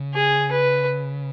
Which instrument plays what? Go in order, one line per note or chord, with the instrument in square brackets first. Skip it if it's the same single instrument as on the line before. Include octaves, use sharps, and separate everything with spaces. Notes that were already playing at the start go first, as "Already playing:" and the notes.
Already playing: [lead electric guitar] C#3
[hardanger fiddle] G#4
B4